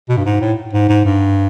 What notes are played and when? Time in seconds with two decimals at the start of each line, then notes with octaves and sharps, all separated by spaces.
0.09 B2
0.17 G2
0.25 G#2
0.41 A2
0.73 G#2
0.89 G#2
1.05 G2